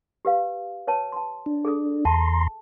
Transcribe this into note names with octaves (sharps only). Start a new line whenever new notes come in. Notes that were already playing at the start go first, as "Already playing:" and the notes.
G4 B4 F5
B4 C#5 A5
A5 C6
D4
G#4 A4 D#6
E2 A5 A#5 C6